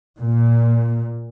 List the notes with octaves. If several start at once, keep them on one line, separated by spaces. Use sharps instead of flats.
A#2